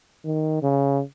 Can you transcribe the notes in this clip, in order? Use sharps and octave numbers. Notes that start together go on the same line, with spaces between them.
D#3
C#3